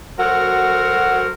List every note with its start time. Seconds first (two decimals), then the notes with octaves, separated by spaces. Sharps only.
0.19 F#3 F#4 A4 A#4 C5